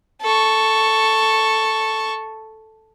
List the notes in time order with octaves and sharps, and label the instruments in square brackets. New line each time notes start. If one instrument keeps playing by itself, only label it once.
[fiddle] A4 C#6